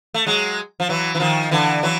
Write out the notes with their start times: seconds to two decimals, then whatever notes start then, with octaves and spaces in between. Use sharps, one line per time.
0.14 A3
0.27 F#3 G#3
0.80 F3
0.89 E3 F#3
1.15 E3
1.20 D#3 F3
1.51 D3 E3
1.83 E3 F#3